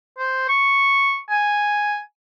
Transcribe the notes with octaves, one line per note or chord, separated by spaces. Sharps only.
C5
C#6
G#5